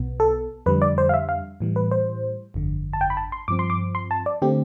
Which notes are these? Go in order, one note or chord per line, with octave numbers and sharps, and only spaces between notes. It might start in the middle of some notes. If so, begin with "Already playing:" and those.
Already playing: B1 B2 B3
A4
F2 D3 G3 B4
D5
C5
F5
E5
F5
A2 E3 G3
B4
C5
G1 F2 D3
A5
G5
B5
A5
C6
G2 F3 C4 D6
C6
D6
C6
A5
D5
D3 A3 C4 G4